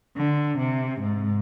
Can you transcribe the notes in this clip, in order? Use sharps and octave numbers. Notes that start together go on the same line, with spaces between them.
D3
C3
G#2